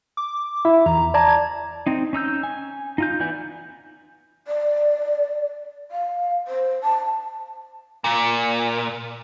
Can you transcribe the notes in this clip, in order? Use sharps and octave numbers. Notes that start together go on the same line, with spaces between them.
D6
E4 E5
E2 A#5
D5 A5 A#5 G#6
C4 D#4
C#4 D#4 E6 G6
G#5
D#4 F4 G6
E3 B3 D5 G#5 G6
D5
F5
C5
A5
A#2